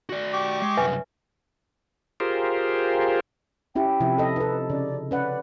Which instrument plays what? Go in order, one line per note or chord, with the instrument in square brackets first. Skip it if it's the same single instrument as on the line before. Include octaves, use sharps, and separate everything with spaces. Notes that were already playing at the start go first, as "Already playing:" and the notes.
[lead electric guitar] F#4 D5
[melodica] G4 C#6 D6
[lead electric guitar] G#3
[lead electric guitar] C2 F#2 [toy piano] B4 E5 G#5
[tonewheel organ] F4 G4 G#4 A#4 C5
[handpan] C#4 E4 G4 [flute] G5
[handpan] C3 F3 E4
A4 D#5
[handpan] D#4 A4 [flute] B4
[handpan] C#3 [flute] D5
[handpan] C#4 B4 F#5 [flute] D5